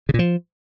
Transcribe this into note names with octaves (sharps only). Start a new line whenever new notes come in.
C#3
A#2
F3